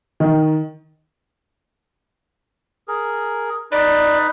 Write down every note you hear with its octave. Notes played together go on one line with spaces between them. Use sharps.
D#3
G#4 A#4
D#4 B4 D5 B5